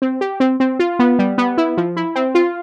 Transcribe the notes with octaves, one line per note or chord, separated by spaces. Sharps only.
C4
G4
C4
C4
F4
B3
G3
B3
E4
F3
E4
C4
F4